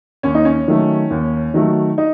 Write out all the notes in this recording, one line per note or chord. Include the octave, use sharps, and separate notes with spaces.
D#2 C#4
D#4
C#4
D#3 F#3 A3
D#2
D#3 F#3 A3
D#4